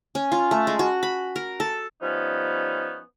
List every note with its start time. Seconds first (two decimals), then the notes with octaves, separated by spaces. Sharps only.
0.15 C#4
0.32 F4
0.51 A3
0.67 G#3
0.79 F#4
1.03 B5
1.36 A#4
1.60 A4
2.02 F3 G3 B3 C#4 D#4